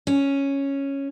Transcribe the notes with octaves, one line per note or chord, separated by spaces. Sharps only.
C#4